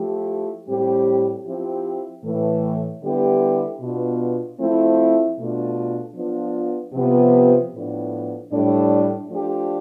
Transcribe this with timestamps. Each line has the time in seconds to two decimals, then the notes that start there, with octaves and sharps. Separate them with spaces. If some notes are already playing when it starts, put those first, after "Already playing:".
Already playing: F3 A3 E4 G4
0.67 A2 G3 C4 G4
1.45 F3 C4 E4 G4
2.23 A2 E3 A3
3.02 D3 G3 B3 E4 G4
3.80 B2 B3 D4 F4
4.59 F3 A3 C4 E4
5.38 B2 A3 D4 F4
6.16 F3 B3 D4 F4
6.93 C3 F3 B3
7.73 A2 F3 B3 D4
8.51 A2 G3 D4
9.30 F3 A3 D4 G4